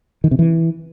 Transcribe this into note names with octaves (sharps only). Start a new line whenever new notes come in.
D#3
C3
E3